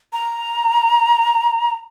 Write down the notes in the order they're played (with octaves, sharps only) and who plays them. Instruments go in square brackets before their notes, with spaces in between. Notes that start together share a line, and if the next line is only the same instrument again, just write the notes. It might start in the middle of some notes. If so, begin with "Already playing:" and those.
[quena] A#5